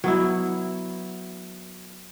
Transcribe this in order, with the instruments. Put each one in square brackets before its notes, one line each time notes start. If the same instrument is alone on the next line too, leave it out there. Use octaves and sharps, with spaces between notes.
[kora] F#3 B3 E4